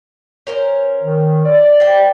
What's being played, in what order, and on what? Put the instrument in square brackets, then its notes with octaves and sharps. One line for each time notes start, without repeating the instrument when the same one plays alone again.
[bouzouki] C#4 A#4 C5
[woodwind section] D#3
D5
[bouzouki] C5 G5